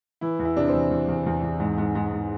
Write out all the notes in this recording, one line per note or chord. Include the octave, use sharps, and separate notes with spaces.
E3 E4
E2
E4
C3 D4
C4
E2
E2
E2
E2
E2
G#2
G#2
G#2
G#2